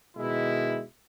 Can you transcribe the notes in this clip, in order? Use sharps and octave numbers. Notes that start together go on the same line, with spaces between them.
B2 D#3 G#3 E4